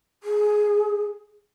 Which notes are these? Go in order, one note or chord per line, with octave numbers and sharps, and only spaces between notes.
G#4